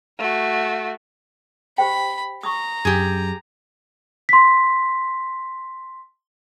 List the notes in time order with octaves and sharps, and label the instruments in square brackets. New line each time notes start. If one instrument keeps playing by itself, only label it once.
[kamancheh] A3 F#4
[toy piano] G4 C5 G5 [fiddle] B5
[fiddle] A#5 [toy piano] C#6 D#6
[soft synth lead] F#2 [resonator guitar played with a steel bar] G4 G#4
[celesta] C6 B6